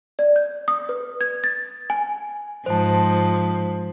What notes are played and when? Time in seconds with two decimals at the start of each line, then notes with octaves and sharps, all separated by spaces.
0.19 D5
0.36 G6
0.68 D#6
0.89 B4
1.21 G#6
1.44 A6
1.90 G#5
2.66 G#2 F3 C5 A5